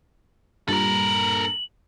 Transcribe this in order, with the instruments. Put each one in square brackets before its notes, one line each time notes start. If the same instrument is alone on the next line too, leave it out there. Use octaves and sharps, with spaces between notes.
[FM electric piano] G2 A#2 [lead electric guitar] A4 A#4 [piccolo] F#7